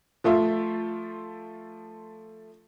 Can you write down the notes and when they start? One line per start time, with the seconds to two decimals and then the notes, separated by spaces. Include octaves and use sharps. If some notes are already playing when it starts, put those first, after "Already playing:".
0.24 F3 A3 F4 E5